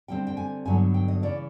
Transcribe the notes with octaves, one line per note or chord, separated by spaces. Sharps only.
D3 G3 C4 G5
G5
G#5
G2 D3 F#3 B3 G#5
G5
D#5
C#3 E3 D5